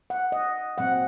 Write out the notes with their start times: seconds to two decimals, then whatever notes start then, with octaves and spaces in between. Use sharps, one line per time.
0.10 F#5
0.32 D#5
0.78 A#2 F#3 C4 F#5